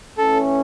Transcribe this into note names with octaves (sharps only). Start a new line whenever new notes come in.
E3 A3 C#4 A4